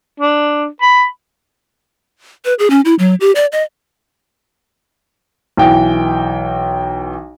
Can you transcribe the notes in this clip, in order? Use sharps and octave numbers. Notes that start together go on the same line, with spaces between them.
D4
B5
B4
G#4
C#4
E4
F#3
G4
D5
D#5
B1 E3 G5